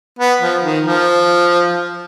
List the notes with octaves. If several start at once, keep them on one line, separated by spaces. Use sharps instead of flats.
B3
F3
D#3
F3